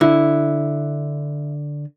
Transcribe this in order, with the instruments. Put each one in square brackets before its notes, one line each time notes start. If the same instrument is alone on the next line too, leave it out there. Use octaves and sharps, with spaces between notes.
[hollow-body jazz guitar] D3 [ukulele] E4